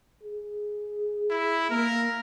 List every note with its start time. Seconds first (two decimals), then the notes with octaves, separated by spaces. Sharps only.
0.23 G#4
1.30 E4
1.70 A#3 A#4